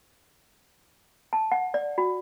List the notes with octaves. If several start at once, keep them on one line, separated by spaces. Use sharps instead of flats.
A5
F#5
D5
F#4